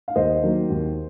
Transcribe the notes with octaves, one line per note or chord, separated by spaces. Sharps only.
F5
D#2 C5 D#5
D#3 F#3 A#3
D#2